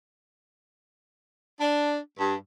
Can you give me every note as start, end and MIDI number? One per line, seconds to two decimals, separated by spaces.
1.61 1.98 62
2.19 2.36 43